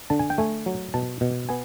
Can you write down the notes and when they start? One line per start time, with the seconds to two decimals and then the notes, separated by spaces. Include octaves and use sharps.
0.10 D3 A5
0.19 G#5
0.30 G5
0.38 A3 G#5
0.66 F#3
0.94 B2 A5
1.21 B2
1.49 B3 G#5